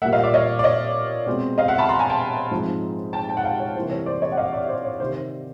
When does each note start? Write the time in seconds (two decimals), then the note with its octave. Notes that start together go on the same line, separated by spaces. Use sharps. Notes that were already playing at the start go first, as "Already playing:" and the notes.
0.02 A#2 G3 A#3 E5 F#5
0.13 D#5 F5
0.23 D5 E5
0.34 C#5 D#5
0.59 D5
0.64 C#5 D#5
1.27 B2 G#3 C4
1.58 D#5 F5
1.68 E5 F#5
1.78 A5 B5
1.89 A#5 C6
1.99 G#5 A#5
2.10 G5 A5
2.51 G#2 F3 G#3 C4
3.13 G5 A5
3.29 G5 A5
3.37 F#5
3.44 F5 G5
3.60 C#5
3.76 C3 E3 G3 A#3 C5
3.91 C#5
4.06 C5 D5
4.22 C#5 D#5
4.32 F#5
4.37 D#5 F5
4.53 D5 E5
4.68 C5 D5
4.85 C#5
5.00 C3 D#3 C5